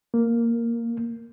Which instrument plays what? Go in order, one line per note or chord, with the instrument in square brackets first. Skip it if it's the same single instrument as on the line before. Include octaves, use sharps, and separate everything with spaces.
[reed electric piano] A#3